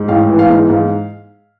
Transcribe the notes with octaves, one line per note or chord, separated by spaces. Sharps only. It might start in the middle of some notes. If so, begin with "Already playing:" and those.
Already playing: G#2
A1 F5
E3
F5
G#2
G#2 F5